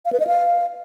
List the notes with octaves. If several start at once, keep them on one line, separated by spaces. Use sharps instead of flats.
F5
B4
D#5
F5